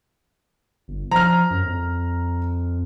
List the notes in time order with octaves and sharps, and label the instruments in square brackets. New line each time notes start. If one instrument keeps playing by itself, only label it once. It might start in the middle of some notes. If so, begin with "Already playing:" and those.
[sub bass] G1
[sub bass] F3 [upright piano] A#5 F6
[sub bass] F#2
F2